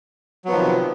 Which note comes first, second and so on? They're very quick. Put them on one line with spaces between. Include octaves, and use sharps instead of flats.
F#3 B3 F3 D#3 C3